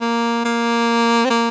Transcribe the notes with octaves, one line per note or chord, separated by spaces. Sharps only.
A#3
A#3
C4
A#3